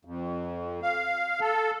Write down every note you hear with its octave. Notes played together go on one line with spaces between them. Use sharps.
F2
F5
A4